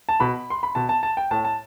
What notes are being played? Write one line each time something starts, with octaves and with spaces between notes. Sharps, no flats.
A5
B2 B5
C6
B5
B2 A5
A5
A5
G5
A2 A5
A5